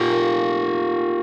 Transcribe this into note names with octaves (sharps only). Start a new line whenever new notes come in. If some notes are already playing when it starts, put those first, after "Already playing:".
Already playing: A#2 F#3 F4 G4
A#3